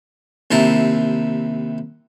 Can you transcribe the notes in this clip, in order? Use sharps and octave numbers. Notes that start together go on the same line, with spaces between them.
D#2 C3 E4 A5 A#5